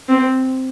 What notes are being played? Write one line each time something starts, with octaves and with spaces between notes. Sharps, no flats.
C4